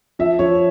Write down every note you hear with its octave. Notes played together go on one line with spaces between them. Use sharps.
F3 E5
F3 C#5